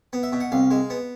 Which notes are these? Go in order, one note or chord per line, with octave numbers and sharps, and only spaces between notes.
B3
E5
B2
F#5
C2 F5
G#3
B3